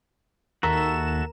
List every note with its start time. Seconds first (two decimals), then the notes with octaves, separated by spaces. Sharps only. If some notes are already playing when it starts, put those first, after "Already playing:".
0.63 D#2 F#4 A4 A#4 E5 E7